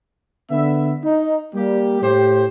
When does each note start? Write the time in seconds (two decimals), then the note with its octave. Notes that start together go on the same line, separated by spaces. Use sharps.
0.50 D3 B3 E5
1.04 D#4
1.55 G3 A#3 G4
2.02 A2 G4 C5